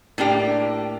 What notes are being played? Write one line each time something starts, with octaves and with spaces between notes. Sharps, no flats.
A2 A#3 D4 G4